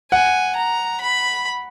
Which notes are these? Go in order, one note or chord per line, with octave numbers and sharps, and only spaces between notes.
F#5 G#5
A#5
B5